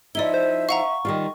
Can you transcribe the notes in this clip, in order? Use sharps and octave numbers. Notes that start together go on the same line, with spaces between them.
F3 D#4 E4 D5 E5 G7
C5
F5 F#5 A#5 C#6
D#3 G3 F4